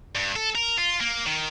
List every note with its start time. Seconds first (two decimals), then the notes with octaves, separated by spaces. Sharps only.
0.15 G2
0.36 A4
0.55 A#4
0.78 F4
1.00 A#3
1.26 D#3